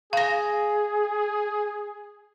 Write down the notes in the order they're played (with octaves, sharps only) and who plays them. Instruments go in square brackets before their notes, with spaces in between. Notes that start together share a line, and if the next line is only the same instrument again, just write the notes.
[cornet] G#4 [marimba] F5 A#6